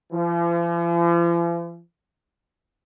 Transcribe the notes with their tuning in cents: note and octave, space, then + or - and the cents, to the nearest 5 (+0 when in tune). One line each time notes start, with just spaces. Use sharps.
F3 -45